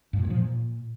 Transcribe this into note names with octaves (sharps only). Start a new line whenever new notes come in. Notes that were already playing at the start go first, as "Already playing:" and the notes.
G2
A#2
G2
F3
A#2